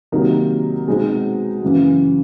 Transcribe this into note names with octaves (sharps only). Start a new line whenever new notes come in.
C3 D#3 F#3 A#3 D#4
B2 G#3 C4 D#4
F#2 C#3 E3